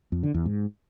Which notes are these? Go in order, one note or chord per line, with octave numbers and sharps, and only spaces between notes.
F2
D3
E2
G#2